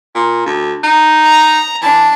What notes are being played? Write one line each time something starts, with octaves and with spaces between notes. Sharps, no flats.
A#2
D2
D#4
A#5
E3 D4 A5